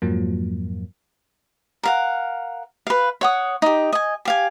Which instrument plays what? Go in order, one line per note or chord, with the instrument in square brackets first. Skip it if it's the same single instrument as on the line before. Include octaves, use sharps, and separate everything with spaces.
[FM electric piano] F2 G#2 F3 F#3 A#3
[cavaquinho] A#4 F5 F#5
B4 F5
C#5 F#5 D#6
D#4 G4
D#5 G#5
G4 F5 G#5